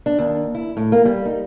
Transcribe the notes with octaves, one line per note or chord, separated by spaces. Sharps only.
D4
D#2
E4
A2
A#3
G3
D#4